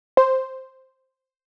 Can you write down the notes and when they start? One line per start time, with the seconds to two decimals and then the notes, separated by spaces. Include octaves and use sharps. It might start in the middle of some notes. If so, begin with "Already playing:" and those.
0.17 C5